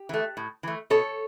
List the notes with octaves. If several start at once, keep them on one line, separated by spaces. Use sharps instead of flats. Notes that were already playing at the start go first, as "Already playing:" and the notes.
Already playing: G4
E3 A3
A2
E3 A3
B2 A4 C#5